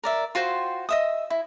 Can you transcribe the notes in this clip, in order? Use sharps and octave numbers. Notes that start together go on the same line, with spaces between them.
A#4 D5 E5
F4 F#4 C5 G5
D#5 E5 D#6
E4